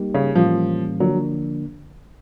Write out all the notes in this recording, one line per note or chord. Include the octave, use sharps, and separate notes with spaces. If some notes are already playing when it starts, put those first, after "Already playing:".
Already playing: G3 A#3 D#4 G4
C#3
A2 E3 F3 G3 A#3 C#4
D3 F3 F#3 A#3 D4